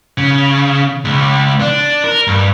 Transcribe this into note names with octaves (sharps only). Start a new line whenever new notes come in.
C#3
C#2
D4
A#4
G2